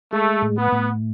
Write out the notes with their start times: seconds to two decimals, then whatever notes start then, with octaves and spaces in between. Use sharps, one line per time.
0.12 G#3 A3
0.42 A2
0.57 B3
0.72 A2